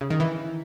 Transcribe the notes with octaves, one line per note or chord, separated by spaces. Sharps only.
C#3
D#3
E3